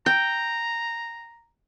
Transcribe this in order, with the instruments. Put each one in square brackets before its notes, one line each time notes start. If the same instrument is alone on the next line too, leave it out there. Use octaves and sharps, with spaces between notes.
[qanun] G5 [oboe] A#5